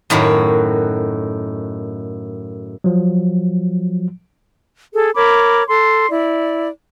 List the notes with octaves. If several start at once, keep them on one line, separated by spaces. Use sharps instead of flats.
F#2 A2 D#3 F#4
F3 F#3
G#4 A4
A#4 C#5 B5 D6
A4 C6
E4 D5